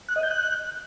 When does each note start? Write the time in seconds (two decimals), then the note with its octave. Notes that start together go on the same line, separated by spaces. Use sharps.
0.08 F#6
0.16 D#5
0.23 G6
0.31 F#6